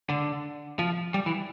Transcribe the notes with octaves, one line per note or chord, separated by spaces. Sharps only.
D3
F3
G3
E3